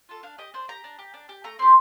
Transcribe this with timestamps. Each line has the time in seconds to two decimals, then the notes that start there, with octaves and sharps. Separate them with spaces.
0.09 F4 A4
0.23 D4 F5
0.38 G4 D#5
0.54 D4 C5
0.68 G4 A#5
0.84 D4
0.99 G4
1.14 D4
1.29 G4
1.44 A3 A#5
1.59 C4 G4 C6